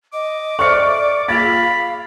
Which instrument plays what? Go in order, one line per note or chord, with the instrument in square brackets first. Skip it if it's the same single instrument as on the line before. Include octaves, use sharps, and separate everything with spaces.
[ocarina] D#5 [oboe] D6
[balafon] A4 C5 E5 [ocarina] D5 [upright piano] C#6 F6 C#7
[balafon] A#3 F4 G#4 [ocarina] F5 [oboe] B5 [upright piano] A6